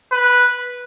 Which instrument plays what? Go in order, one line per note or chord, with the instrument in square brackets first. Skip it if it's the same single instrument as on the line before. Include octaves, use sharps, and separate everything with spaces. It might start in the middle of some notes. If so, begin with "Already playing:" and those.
[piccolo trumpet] B4